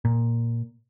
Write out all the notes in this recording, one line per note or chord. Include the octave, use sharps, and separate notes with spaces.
A#2